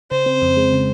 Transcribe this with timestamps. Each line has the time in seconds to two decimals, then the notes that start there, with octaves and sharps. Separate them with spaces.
0.12 C#3 C5
0.26 C4
0.42 F2
0.57 G#3
0.73 C#3